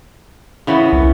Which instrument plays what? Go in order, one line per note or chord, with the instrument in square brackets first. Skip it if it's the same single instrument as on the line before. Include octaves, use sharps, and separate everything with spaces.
[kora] C#3 E3 B3
[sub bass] C2